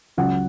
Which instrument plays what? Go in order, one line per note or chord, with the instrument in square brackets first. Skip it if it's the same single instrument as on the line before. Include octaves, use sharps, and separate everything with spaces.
[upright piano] C#2 C#3 F#3 F#5